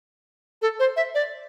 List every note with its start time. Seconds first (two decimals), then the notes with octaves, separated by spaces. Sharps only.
0.62 A4
0.79 C5
0.96 E5
1.15 D5